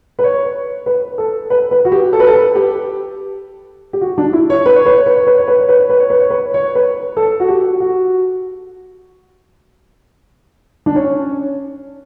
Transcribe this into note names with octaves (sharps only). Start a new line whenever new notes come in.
B4
C#5
B4
A4
B4
B4
F#4
G4
A4
B4
A4
B4
G4
G4
F#4
D4
E4
C#5
B4
C#5
B4
C#5
B4
C#5
B4
C#5
B4
C#5
B4
C#5
B4
C#5
B4
C#5
B4
C#5
B4
A4
F#4
G4
F#4
D4
C#4